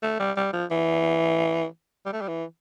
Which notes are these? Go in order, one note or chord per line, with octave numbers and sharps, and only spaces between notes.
A3
G3
G3
F3
E3
G3
A3
G3
E3